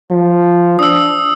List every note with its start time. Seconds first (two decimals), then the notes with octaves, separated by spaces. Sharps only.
0.10 F3
0.79 D4 D#6 E6